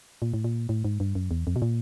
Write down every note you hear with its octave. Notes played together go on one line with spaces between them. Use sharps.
A#2
A2
A#2
A2
G#2
G2
F#2
E2
F2
B2
A#2